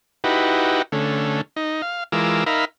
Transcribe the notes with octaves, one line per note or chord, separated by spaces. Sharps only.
D#4 E4 F#4 G4 B4
D3 A3 C#4
D#4
F5
E3 G#3 F4 A#4 D6 E6
D#4 A#4 E5 F5 B5